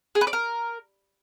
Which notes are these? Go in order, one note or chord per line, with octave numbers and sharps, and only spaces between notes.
G#4
B4
D5
A#4